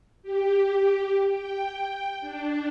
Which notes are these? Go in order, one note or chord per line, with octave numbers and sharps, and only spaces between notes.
G4
G5
D4